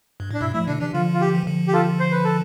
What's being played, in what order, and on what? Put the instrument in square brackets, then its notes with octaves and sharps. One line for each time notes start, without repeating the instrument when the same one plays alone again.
[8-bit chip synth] G2
[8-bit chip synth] A2 [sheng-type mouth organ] D4
[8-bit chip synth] G2 B2 [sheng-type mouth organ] E4
[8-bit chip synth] F3 A3 [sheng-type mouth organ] E4
[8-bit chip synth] B2 D3 [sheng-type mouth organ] D4
[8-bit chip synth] C3 E3 [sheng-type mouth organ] D4
[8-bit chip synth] D3 F3 [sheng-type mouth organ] F4
[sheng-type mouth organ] F4
G4
[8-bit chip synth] E3
D3 F3
[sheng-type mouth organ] G4
F4 A4
C5
B4
A4